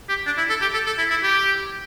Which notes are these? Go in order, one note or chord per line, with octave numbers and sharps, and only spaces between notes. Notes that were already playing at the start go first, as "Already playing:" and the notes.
G4
D4
E4
A4
G4
A4
A4
E4
E4
G4